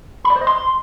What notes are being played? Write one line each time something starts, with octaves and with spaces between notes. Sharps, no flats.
B5
D5
C5
D#5
C6